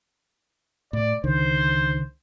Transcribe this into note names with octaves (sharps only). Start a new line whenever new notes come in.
A2 D5
C#2 D3 D#3 C5